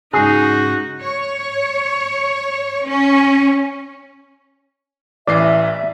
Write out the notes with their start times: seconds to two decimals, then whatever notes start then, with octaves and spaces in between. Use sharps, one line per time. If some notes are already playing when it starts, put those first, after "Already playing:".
0.13 G#2 C#3 D#4 F#4 G#4
1.00 C#5
2.87 C#4
5.28 A1 E3 D5 E5 C7